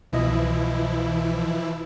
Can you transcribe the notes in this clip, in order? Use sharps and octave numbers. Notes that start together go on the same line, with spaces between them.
C2 B2 E3 F3 E4 D#5